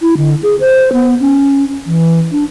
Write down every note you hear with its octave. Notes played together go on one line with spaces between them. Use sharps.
E4
D3
G#4
C5
B3
C#4
E3
D4